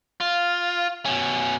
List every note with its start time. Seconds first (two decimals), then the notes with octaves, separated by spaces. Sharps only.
0.21 F4
1.06 B2 C#4